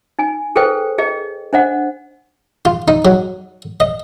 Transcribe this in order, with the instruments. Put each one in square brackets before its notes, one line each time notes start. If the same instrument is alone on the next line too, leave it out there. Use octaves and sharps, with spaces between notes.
[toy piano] D#4 G#5
G#4 A4 B4 C5 G5
G#4 D#5
D4 C5 D#5 F#5
[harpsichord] F4
D#4
F#3
D#5